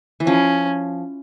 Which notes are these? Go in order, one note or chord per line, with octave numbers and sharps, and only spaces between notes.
E3
F3 C#4